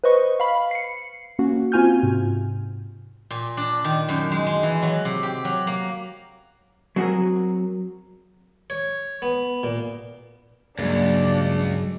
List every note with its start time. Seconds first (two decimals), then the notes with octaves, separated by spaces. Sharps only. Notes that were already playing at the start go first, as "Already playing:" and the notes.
0.04 B4 C5 D#5 C#6
0.40 F5 B5
0.71 C7 C#7
1.39 A#3 C#4 F#4
1.72 C4 F4 F#4 G#5 F6 G6
2.03 G#2 C3
3.31 A#2
3.57 D4
3.84 D#3
4.09 F#2
4.32 G#3
4.47 G#3
4.63 E3
4.83 F#3
5.05 C3
5.23 G4
5.45 F#3
5.67 A#3
6.96 F#3 C4 F#4 G#4 A#4
8.70 C#5
9.22 B3
9.63 A#2
10.79 C#2 G2 F#3 G#3 A#3 D4